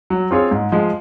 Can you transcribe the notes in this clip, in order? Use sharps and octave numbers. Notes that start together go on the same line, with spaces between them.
F#3
C4 F4 G#4 C#5
G#2
F3 G#3